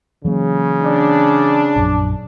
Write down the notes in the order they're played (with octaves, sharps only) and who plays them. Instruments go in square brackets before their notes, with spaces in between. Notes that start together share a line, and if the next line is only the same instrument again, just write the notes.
[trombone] C#3 [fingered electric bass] E3 F#3 A#3
[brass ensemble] D4
[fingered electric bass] A#1 F#2